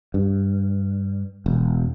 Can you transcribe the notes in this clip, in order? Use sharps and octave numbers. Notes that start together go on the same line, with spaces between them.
G2
E1